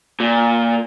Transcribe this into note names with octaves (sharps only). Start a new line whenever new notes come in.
A#2